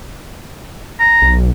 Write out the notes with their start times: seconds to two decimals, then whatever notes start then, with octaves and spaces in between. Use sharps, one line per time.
1.00 A#5
1.22 B1